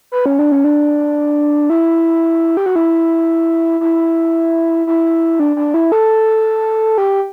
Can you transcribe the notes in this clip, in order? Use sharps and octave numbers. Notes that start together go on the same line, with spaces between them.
B4
C#4
D4
C#4
D4
E4
G4
F#4
E4
E4
E4
D4
D4
E4
A4
G4